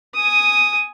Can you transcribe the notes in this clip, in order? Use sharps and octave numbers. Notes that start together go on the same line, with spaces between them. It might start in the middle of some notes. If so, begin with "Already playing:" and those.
G#5 D#6